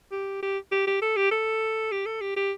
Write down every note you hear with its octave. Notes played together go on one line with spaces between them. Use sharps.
G4
G4
G4
G4
A4
G4
A4
G4
A4
G4
G4